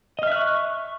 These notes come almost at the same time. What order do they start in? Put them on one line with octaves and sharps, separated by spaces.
D#5 F6 E5 F#6 C#6